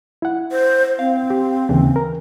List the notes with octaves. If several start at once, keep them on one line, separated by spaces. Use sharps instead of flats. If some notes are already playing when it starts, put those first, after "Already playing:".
E4 F#5
C5
C4 F5
G4
D#2 C#3 E3
A#4